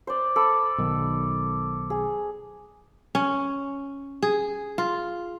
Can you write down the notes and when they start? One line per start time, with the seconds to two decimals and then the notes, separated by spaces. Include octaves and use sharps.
0.07 C5 D5
0.36 A4 B5 D6
0.78 B1 D#3
1.90 G#4
3.15 C#4
4.22 G#4
4.78 F4